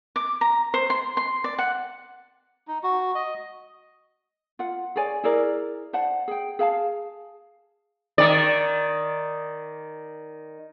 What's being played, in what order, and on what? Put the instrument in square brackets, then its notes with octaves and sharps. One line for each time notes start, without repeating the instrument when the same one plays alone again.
[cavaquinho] D6
A#5
C5
C6
C6
D5
F#5
[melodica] D#4
F#4
D#5
[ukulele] F4 F#5
G#4 C#5 D5 G#5
E4 G#4 A#4 D5
C5 D5 F#5 A5
G#4 G5
G#4 F5 G5 A5
[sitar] D#3 D5